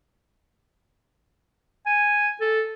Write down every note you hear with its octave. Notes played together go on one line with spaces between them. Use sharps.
G#5
A4